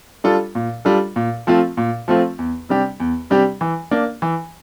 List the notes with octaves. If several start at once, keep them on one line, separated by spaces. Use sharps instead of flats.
G3 D4 F4 A4
A#2
G3 D4 F4 A4
A#2
F3 A3 C4 F4
A#2
F3 A3 C4 F4
E2
C3 G3 D4 G4
E2
C3 G3 D4 G4
E3
A#3 D4
E3